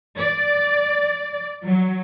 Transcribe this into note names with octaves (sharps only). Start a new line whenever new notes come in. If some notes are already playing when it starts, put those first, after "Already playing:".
D5
F#3